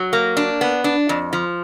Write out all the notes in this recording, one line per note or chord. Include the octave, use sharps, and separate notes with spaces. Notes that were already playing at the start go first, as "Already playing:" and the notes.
Already playing: F#3
A#3
D4
B3
D4
F2
F3